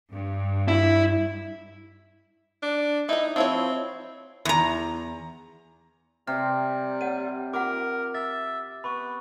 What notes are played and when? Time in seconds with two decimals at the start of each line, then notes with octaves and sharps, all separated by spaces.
0.11 G2
0.68 E4
2.63 D4
3.09 D#4 E4 D#5
3.36 F3 C4 E4 C#5
4.45 E2 A#5
6.27 C3 G3 F6
7.01 C#5 D#5 F#5 D#7
7.53 F4 A#4 F#5 D6
8.14 E5 A6
8.84 B3 B5 C#6